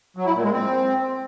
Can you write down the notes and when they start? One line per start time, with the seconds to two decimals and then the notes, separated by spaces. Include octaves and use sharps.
0.17 F#3
0.26 E4
0.35 A#2
0.44 G#3
0.53 C4